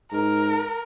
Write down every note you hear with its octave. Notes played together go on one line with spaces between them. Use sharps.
G#2 A#4